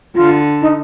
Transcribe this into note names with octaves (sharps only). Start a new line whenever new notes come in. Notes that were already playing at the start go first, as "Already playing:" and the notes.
D3 F4
D#4